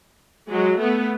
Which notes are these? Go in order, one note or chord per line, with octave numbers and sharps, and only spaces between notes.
F#3 G#3
A3 B3